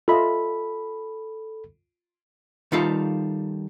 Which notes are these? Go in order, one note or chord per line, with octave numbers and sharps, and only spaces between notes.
F4 A4 D#5 E5 B5
D#3 G3 D#4 F4 A4 F5